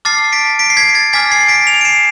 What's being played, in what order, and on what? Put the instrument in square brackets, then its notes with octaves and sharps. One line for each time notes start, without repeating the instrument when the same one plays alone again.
[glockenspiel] A5 D6 F6 A6 C7
B6 D7
B6 D7
C7
G#6 B6
A6
G#5 D6 F6 G#6 B6
A6 C7
B6 D7
D7 F7
D7
C7 E7